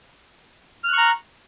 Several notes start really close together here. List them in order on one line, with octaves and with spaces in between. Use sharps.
F6 F#6 C#6 A#5